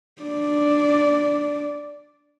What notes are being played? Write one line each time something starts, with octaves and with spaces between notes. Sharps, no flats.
D4 D5